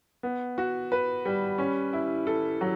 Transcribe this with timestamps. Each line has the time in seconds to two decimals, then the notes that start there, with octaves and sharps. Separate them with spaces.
0.23 B3
0.58 F#4
0.92 B4
1.25 G3
1.58 C#4
1.93 E4
2.27 A4
2.61 F#3